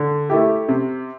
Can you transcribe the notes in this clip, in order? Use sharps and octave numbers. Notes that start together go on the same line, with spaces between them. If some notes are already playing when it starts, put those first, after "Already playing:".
Already playing: D3
A3 E4 G4
C3